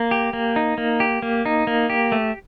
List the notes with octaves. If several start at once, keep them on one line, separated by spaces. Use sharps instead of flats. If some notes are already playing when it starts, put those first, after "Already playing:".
Already playing: A#3
G4
A#3
D#4
A#3
G4
A#3
D#4
A#3
G4
A3